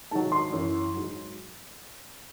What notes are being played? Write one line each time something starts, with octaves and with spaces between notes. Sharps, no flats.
G#2 D#3 F#3 A5
C6
F#2 E3
G#2 F#3